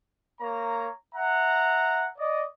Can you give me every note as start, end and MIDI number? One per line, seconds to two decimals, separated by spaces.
0.41 0.90 58
0.41 0.90 73
0.41 0.90 82
1.15 2.05 76
1.15 2.05 78
1.15 2.05 82
2.18 2.44 74
2.18 2.44 75